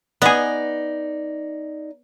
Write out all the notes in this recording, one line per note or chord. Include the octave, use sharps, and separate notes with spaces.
B3 D#4 G#4 D5